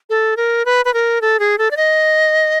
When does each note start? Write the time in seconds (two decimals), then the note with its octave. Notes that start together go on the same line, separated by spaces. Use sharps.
0.10 A4
0.37 A#4
0.65 B4
0.85 B4
0.94 A#4
1.21 A4
1.40 G#4
1.58 A4
1.71 D5
1.77 D#5